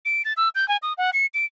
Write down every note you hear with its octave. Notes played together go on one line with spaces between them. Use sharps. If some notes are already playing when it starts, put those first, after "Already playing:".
D7
A6
E6
G6
G#5
D#6
F#5
C#7
D7